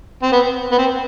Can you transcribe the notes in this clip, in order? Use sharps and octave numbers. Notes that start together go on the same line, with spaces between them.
C4
B3
B3
C4